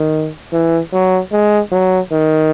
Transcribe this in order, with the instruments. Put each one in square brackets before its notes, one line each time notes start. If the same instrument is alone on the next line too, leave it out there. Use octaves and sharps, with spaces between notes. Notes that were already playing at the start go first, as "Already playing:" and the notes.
Already playing: [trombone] D#3
E3
F#3
G#3
F#3
D#3